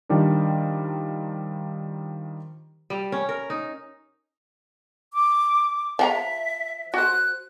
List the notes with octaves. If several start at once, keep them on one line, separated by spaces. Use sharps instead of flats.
D#3 F3 G3 D4 A#4
G3
C#4
A#4
D#4
D6
F3 E5 F#5 A#5
F#4 C5 F#6